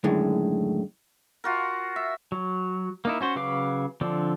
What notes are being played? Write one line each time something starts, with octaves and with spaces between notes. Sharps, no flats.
F#2 A2 D3 D#3 G#3
F4 F#4 A#4
E5
F#3
A#3 D#4 E4
C#4 F#4 C5
C#3 F#3 B4 F5 D6
D3 F3 C4 D4